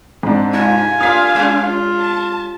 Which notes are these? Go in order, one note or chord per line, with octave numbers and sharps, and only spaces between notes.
G#2 C4 D4
C3 D#4 F4 G#5
A3 D4 F4 F5 D#6 B6
G3 C#4
F4
A5